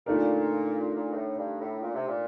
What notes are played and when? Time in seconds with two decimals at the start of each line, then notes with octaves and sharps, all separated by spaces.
0.06 A#2 D3 A3 D#4 A#4
0.95 A#2
1.12 G2
1.16 A2
1.38 G2
1.61 A2
1.83 A#2
1.95 C3
2.08 A#2